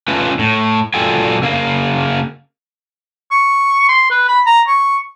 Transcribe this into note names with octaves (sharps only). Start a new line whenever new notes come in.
A3 C#4 E4 F4 B4
A2
A#2 F#3 F4 A4 G5 G#5
C#3 A#3 A#4 F5
C#6
C6
B4
B5
A#5
C#6